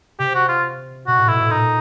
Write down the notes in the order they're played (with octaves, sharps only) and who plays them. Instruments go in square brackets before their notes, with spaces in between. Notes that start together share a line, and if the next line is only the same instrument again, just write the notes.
[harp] C3 [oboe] G4
[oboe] F#4
F4
[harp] B2 [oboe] F#4
[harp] A2
[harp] B2 [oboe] E4
[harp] A2
[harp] A#2 [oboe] D#4